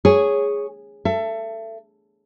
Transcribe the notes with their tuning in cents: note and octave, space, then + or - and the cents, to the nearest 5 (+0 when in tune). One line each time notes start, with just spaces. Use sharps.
G#4 -5 C#5 +0
A4 +20 E5 +30